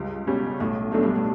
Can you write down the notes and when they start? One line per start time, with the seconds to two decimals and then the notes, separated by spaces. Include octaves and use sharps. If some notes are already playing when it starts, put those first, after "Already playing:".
Already playing: C#2 G2
0.27 B2 G3 C#4
0.60 B1 A2
0.92 F#2 B2 A3 D4 A4
1.03 G2
1.15 A2